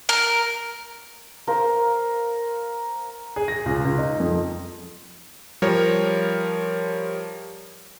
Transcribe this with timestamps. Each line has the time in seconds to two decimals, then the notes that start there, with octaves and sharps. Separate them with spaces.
0.09 A#4
1.47 A#4 C5 F5
3.36 G#4
3.48 A#6
3.66 C#2
3.85 C#2
3.98 D#4
4.20 F2
5.62 F3 G3 A#4 C#5